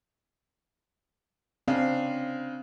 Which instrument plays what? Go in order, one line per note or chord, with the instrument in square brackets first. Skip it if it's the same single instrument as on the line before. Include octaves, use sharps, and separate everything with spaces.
[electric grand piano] C#3 D4 [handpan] C4 F5